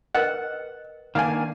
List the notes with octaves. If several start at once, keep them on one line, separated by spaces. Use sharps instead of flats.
A#4 B4 D#5 F#5
D#3 A#3 D4 F5 G#5